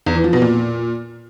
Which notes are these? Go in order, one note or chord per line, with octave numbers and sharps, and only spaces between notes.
E2
E3
F3
B2
A#2